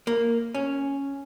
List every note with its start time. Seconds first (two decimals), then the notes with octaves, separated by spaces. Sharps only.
0.07 A#3
0.55 C#4